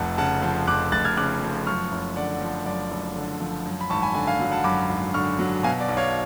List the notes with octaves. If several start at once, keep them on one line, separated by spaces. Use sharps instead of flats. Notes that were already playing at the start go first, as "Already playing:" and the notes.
Already playing: F1 F2 F#5 A5
C#3 F#5 A5
F3
F2 D6 F#6
F1 F#6 A6
F6 G#6
C#3 D6 F#6
F3
F#2 C#6 F6
F#1
D3 D5 F#5
F3
F#2 D5
F#1
D3
F3
F#2
B5
G#1 A5 C#6
G#5 B5
D3 G#5 B5
F5 G#5
F#3
F#5 A5
F#2 B5 D6
G#1
D3 C#6 F6
F#3
B2 F5 G#5
D5
B1
C#5 F5